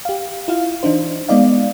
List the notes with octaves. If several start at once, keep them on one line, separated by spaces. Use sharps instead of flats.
G4 F5
E4 F4 F5
E3 D4 D#4 C5
G#3 B3 D#4 D5 D#5 F5